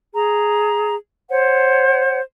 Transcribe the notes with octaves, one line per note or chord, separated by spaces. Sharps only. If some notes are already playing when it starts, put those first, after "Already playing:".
G#4 A#5
C5 C#5 F#5